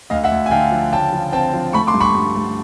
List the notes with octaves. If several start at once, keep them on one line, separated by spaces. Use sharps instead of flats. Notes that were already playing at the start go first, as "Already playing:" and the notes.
D2 D#5 F5
E5 F#5
D2
G#5
D3 F5 G5
F3
C#3 G5 A5
F3
C4 G5 A5
F3
A3 B5 C#6
C6 D6
G2
B5 C#6
G2
A3